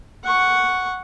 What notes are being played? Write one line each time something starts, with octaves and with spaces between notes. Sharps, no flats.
F#5 C#6